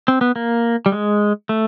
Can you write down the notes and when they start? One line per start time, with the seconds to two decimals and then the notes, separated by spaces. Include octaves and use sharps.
0.08 C4
0.21 B3
0.36 A#3
0.86 G3
0.92 G#3
1.49 A3